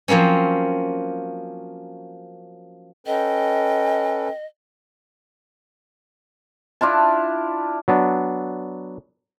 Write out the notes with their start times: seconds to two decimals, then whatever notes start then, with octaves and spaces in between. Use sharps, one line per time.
0.08 F3 F#3 A#3 C4 C#4
3.07 C#4 A4 B4 D#5 G5
6.81 D4 E4 F4 A5
7.88 F#3 B3 D4